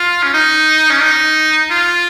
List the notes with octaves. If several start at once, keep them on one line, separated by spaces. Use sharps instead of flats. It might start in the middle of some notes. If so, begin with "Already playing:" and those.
Already playing: F4
C#4
D#4
C#4
D#4
F4